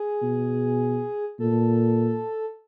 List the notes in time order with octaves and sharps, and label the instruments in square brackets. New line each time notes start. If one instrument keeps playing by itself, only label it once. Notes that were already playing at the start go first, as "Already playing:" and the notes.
Already playing: [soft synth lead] G#4
[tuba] B2
[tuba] A#2 [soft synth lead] A4